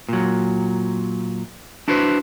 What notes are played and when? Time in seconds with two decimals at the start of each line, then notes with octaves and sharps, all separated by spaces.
0.09 A#2 F#3
1.88 D4 E4 F#4 B4 C5